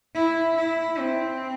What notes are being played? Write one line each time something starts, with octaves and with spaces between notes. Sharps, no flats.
E4
E4
C4